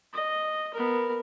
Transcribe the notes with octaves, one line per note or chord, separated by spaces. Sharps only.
D#5
B3 A#4